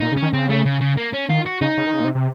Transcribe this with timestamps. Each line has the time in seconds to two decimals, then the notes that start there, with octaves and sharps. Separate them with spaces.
0.01 A#2 D#4
0.12 C#3
0.17 C#4
0.22 D#3
0.33 C#3 C4
0.49 A3
0.65 C#3
0.81 C#3
0.97 A#3
1.13 C#4
1.29 D#3 F4
1.46 F#4
1.61 C#3 D#4
1.77 C#3
1.86 D#3
1.93 C#3
2.00 A#2
2.05 C3
2.15 C3